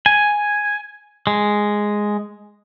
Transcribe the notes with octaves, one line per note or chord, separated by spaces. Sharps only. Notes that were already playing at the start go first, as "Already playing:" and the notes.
G#5
G#3